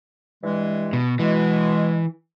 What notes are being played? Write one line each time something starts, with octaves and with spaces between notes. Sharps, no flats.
G2 E3 G#3
B2
B2 E3 G#3